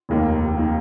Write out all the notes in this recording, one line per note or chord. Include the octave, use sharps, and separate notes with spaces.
F1 D#2 D#3 A#3
D#3 A#3